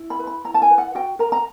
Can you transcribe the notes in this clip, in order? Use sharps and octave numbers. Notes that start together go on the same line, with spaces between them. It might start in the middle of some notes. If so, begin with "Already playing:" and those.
Already playing: E4
B5
B4
B5
E4 A#5
A5
G#5
B4
F#5
F#4 G5
A#4 A#5
A#5